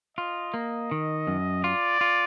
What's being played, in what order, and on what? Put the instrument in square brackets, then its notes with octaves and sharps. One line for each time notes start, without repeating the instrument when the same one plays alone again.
[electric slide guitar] F4 [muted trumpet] D#5
[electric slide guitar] A#3
D#3
F#2
[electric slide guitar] F4 [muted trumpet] D5
[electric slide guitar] F4